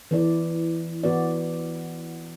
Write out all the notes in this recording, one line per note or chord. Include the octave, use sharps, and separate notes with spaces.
E3 B3 E4 D5
E3 B3 F#4 B4 D5